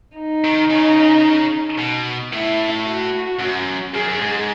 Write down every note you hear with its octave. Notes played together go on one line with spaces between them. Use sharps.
D#4
D#3
C#3
B2
A2 E4
F#4
F#2
F#2 G#4
F#2
G#2